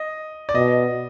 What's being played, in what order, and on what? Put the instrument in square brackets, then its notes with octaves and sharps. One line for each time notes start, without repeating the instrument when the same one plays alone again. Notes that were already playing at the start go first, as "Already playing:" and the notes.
Already playing: [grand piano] D#5
D5
[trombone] B2 [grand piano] D#5